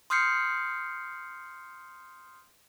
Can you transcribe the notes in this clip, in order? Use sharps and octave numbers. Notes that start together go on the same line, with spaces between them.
C6 D#6 F6 G6 C7 C#7